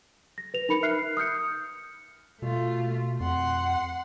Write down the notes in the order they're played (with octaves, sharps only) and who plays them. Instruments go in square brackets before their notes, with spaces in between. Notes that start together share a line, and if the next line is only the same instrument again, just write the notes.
[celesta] A#6
B4 F7
D#4 A#4 B5 C#7
E5 F6 F#6 C7
D#6 F6 G6 C#7
[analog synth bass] B2 [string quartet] A3 F4
[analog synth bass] F2 [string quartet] F#5 C6